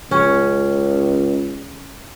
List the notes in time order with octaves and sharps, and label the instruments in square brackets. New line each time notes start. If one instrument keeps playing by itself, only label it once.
[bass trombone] C#2 [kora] C#4